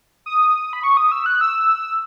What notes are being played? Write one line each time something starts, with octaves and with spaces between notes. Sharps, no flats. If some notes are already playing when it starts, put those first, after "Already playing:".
D#6
B5
C#6
D#6
E6
F#6
E6